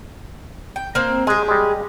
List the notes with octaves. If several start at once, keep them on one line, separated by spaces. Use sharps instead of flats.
G5
A#3 C4
G#3 G4 G#4
G3 G#3